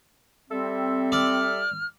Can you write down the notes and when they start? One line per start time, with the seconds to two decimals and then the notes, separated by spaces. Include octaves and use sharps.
0.50 G3 C4 A4 E5
1.12 D5 F6